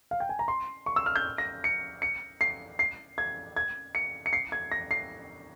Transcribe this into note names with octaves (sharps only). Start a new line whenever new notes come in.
F5
G5
G#5
A#5
C6
C#6
E6
F6
G6
A#6
C#7
C#7
C7
C7
G#6
G#6
C#7
C#7
C7
G#6
A#6
C7